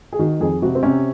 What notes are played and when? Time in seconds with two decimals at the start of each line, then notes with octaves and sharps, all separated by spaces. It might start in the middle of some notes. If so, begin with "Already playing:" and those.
0.13 G#4
0.19 D#3 F#4
0.41 F2 G#4
0.62 C3 F#4
0.75 C4
0.83 C3 C#4